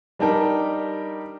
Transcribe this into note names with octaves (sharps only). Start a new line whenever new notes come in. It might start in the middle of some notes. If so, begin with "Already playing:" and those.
G3 D4 D#4 G4 A#4